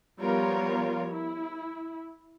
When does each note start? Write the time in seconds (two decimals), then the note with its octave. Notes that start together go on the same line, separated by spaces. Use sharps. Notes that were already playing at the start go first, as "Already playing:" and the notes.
0.20 F3 G3 B3 F4 A#4 C#5
1.11 E4